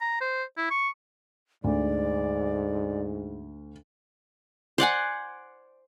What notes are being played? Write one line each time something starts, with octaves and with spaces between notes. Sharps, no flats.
A#5
C5
E4
C#6
D2 G#2 D5
C5 D5 F#5 G#5